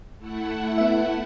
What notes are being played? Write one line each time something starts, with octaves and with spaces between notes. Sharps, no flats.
A3 E4 F#5
B3 E5